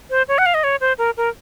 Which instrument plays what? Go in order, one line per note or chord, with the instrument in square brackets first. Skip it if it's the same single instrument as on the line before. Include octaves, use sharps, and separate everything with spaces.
[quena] C5
C#5
F#5
F5
D#5
C#5
C5
A#4
A#4